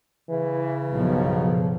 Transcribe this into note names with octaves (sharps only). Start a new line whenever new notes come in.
C#3 E3
B1 G2 B2 F3